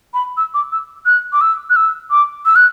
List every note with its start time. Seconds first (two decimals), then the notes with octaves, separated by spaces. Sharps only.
0.14 B5
0.37 E6
0.54 D6
0.72 E6
1.06 F#6
1.33 D6
1.41 E6
1.70 F#6
1.76 E6
2.11 D6
2.46 E6
2.56 F#6